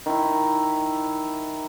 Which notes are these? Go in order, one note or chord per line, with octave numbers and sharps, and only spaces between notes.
D#3 E4